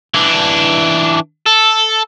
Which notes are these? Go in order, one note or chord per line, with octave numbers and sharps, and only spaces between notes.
E3 D4
A4